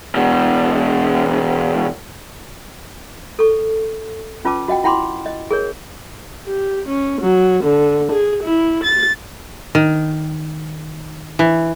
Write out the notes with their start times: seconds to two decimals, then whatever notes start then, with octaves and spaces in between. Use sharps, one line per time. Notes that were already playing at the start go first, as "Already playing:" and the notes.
0.15 E2 B2
3.39 A4 C#6
4.45 C#4 F4 B4 A5 D6
4.68 F#4 D#5 F#5 G5
4.84 E4 F#5 G5 B5 C6 D6
5.26 D#5
5.51 G#4 A#4 C#5
6.45 G4
6.88 C#4
7.20 F#3
7.62 D3
8.10 G#4
8.42 E4
8.82 A6
9.75 D#3
11.39 E3